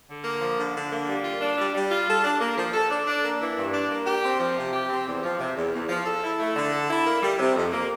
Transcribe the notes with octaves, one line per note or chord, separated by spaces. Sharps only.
D3
A#3
F3
D3
D3
A#3
G3
F4
D4
G3
G3
F4
A4
D4
A#3
F3
A4
D4
D4
A#3
E3
G2
D4
A#3
G4
C4
F3
C3
G4
C4
E2
F3
C3
E2
E2
F3
A4
E4
A3
D3
A4
E4
A#3
G3
C3
F2
A#3